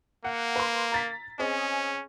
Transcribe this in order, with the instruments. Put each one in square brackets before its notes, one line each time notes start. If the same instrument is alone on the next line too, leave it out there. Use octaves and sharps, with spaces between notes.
[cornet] A#3 [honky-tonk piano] F#5
[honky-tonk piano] B4 C6
A#5 A6 B6
[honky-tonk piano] C4 G#4 D#5 [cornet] C#4